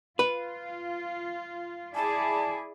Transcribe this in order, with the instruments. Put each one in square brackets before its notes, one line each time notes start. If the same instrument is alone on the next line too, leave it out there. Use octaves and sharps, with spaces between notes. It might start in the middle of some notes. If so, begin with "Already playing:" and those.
[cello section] F4 [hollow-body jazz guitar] B4
[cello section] E4 G#4 D5 [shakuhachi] A5